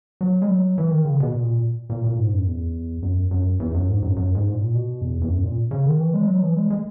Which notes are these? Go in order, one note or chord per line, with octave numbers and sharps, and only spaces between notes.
F#3
G#3
F#3
E3
D#3
C#3
B2
A#2
A#2
A#2
G#2
F#2
E2
F#2
F#2
E2
F#2
G#2
F#2
F#2
G#2
A#2
B2
E2
E2
F#2
A#2
C#3
D#3
E3
G#3
F#3
E3
G#3
G#3